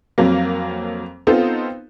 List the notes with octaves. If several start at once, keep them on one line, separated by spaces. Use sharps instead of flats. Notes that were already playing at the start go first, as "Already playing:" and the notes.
F2 F#3 A#3
B3 C4 D#4 F4 A4 C5